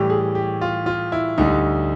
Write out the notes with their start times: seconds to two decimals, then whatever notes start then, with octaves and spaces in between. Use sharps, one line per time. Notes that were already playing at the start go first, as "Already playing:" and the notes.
Already playing: A2 E3 G3 G4
0.10 G#4
0.35 G4
0.61 F4
0.86 F4
1.12 E4
1.38 D2 D3 G3 D#4